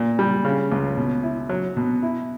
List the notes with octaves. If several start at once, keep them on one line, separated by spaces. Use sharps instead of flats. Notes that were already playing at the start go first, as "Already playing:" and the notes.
Already playing: A#2
G3
C#3
C#2
B2
E4
F#3
B2
E4